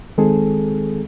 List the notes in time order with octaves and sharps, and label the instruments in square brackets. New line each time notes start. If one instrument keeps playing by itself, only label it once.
[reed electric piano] D#3 G#3 C4 G#4 A4